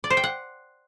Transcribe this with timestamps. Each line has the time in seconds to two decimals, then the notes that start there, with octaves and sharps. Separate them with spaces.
0.04 D5
0.10 C5
0.17 G5
0.24 F#5